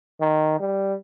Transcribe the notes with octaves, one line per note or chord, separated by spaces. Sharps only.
D#3
G3